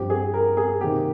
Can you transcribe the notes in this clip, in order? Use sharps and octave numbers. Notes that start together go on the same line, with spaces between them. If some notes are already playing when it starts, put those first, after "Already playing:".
Already playing: G2 F3 C4 G4
G#4
A#4
G#4
C3 D#3 A#3 G4